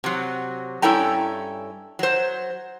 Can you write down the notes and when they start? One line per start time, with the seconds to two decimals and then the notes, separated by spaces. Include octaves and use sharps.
0.04 C3 F#3
0.82 G2 C#4 E4 A4 G5 A#5
1.99 F#3 C5